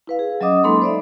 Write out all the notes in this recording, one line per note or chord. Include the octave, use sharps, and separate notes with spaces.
E4 B4 F5
G#4
F#3 C#4 D#5 D6 D#6
G#3 A#3 D#4 A4 B5 C6
C5 D5 E5